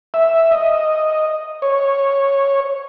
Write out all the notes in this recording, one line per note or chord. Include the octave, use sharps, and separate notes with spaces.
E5
D#5
C#5